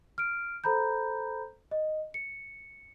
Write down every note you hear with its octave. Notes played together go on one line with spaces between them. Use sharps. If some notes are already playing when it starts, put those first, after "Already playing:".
F6 D7
A4 C5 A#5 B5 G6
D#5
C#7